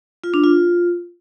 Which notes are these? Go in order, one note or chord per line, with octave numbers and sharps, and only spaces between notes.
F4
D4
F4